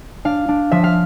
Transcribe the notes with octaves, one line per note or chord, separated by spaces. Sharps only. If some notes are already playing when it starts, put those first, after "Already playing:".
D4 F5
D4
F3 E5
F5